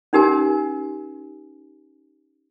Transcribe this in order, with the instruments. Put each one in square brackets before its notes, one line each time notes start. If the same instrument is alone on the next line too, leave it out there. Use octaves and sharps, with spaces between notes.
[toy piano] C#4 D#4 G4 A#4 G#5